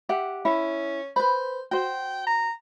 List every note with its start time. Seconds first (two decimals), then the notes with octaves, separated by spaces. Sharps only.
0.09 G4 E5 F#5
0.45 C#4 E4
1.16 B4 C5 B5
1.71 F#4 C5 G5
2.27 A#5